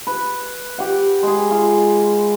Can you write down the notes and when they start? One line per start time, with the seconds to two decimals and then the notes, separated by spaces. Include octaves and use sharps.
0.07 B4
0.78 G4 F#5
1.23 G#3 G#4
1.51 F4